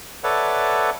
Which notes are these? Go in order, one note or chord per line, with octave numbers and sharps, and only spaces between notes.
A4 B4 C#5 D5 E5 F#5